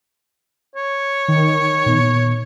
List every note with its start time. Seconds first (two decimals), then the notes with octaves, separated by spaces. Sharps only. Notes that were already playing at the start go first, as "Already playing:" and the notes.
0.75 C#5
1.28 D#3
1.86 A#2 B3